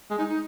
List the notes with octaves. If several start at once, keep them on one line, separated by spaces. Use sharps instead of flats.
G#3
D#4
D#4